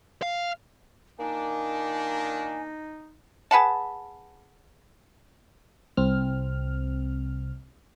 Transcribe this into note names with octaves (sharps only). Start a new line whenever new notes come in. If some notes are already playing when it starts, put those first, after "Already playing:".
F5
A#2 D#3 A#3 D4 D#4 G#5
G#4 B4 F#5 A5
C2 C4 F6